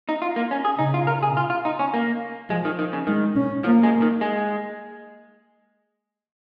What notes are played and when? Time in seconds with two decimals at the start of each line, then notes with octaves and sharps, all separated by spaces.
0.09 D#4
0.22 F4
0.36 A#3
0.51 C#4
0.65 G#4
0.79 C#3 D#4
0.94 F4
1.07 A#4
1.23 G#4
1.37 F4
1.50 F4
1.65 D#4
1.79 C#4
1.94 A#3
2.50 F3 G#3
2.65 D#3
2.79 D#3
2.93 C#3
3.07 D#3 G#3
3.36 C#4
3.64 F3 A#3
3.83 G#3
4.02 D#3
4.21 G#3